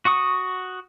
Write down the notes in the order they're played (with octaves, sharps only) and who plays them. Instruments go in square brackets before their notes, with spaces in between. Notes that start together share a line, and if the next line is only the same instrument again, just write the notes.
[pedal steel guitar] F#4 F#5 C#6 D#6